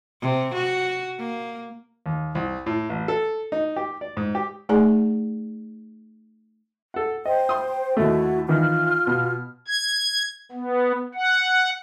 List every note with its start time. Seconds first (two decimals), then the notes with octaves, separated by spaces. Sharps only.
0.21 C3
0.54 F#4
1.18 A#3
2.06 D#2
2.35 C2
2.66 A2
2.89 A1
3.08 A4
3.52 D#4
3.76 G4
4.01 D5
4.17 G#2
4.35 G4
4.69 A3 D#4 G#4 D5 G#5 A#5
6.94 A4 F#5
7.25 C5 D#5 G5
7.49 C6 D#6
7.97 D#2 A3 E4 F#4
8.49 D#3 E3 F4 F6
9.07 B2
9.68 G#6
10.52 B3
11.14 F#5